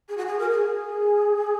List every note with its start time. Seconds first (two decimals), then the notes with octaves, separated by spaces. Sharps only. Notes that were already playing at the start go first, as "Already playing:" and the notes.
0.08 G#4
0.17 F#4
0.26 G#4
0.38 A#4
0.50 G#4